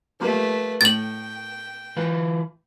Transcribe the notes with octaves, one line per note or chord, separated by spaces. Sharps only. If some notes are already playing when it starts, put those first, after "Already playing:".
F3 G3 A3 A#3 B4
A2 G5 A6 F#7
E3 F4 B4